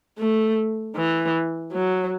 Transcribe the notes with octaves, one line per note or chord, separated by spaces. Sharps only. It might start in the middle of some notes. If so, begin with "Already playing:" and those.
A3
E3
F#3